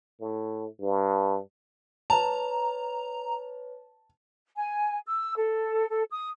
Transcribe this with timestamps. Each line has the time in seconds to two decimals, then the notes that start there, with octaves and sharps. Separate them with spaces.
0.21 A2
0.80 G2
2.10 B4 C#5 A5 A#5
4.56 G#5
5.07 E6
5.36 A4
5.89 A4
6.11 D#6